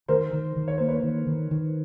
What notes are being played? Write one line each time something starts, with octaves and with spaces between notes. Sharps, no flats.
D#3 A#4 C5
D#3
D#3
C#5
A#3 C5
B4 C#5
D#3
D#3
D#3